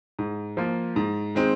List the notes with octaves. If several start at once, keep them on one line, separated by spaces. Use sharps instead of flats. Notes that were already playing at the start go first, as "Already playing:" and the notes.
G#2
F3 A#3 F4
G#2
D#3 G#3 C4